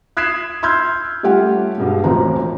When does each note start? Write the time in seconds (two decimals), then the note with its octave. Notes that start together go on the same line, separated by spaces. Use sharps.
0.17 D#6 F#6 G#6 B6 C7 E7
0.63 C6 E6 F6 G6 G#6
1.23 G3 A3 C#4 F4 G4 F#5
1.78 G2 B2 G#3
2.04 E1 A1 F3 C4 A#5